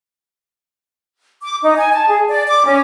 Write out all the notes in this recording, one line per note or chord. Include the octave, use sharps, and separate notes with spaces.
D6
D#4
G#5
A5
G#4
D5
D6
C#4